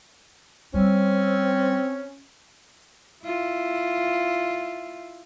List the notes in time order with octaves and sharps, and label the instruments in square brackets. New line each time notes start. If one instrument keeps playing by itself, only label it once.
[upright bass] G3 [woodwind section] C4 [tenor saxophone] C#4
[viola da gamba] E4 F4